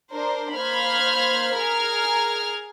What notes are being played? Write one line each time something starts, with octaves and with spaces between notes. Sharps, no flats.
D4 A#4 C5
A#3 C5 B5 F6 G#6
G#4 A#4 F6 G#6